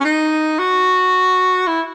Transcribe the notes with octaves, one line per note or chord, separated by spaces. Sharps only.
C#4
D#4
F#4
E4